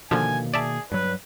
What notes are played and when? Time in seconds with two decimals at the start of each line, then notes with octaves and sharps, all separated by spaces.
0.11 B2 D3 D#3 F3 A#3 G#5
0.54 G#4 D5 E5 A5
0.92 G2 F#3 B4